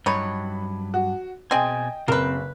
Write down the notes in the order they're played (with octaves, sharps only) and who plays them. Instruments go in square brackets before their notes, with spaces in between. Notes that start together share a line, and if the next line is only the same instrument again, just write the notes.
[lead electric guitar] G2 F#3 [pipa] D#4 C#5 [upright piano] B5
[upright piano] F#4
[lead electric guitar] B2 G#5 [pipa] C4 G#4 [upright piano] D#5 G5
[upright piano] F#1 [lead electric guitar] C4 [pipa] A#4 B4